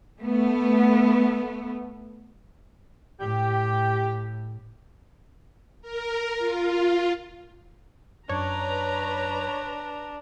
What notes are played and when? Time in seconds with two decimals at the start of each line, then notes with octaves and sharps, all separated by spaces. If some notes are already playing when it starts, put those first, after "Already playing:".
0.20 A3 B3
3.21 A2 G4
5.82 A#4
6.38 F4
8.29 F#2 D4 B4 C#5 A#5